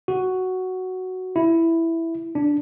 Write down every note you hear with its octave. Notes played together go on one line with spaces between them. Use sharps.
F#4
E4
D4